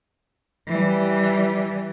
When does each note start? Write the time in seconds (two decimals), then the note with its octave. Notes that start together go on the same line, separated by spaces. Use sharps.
0.68 E3 G3